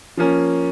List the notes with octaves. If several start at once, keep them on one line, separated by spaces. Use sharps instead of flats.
F3 A#3 C#4